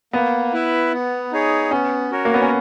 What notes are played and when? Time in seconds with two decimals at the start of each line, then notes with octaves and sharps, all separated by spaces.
0.13 A#3 B3
0.53 E4 B4 E5
0.92 B3
1.32 D#4 G#4 C#5
1.71 B3 C#4
2.11 F#4 A#4 C#5
2.25 A#3
2.34 B3
2.42 C#4